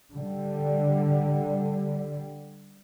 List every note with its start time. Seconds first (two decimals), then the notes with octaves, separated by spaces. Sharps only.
0.13 D3 G3